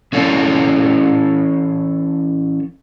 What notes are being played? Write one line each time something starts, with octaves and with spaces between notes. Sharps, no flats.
E3 C#4 E4 A4 C#5 F5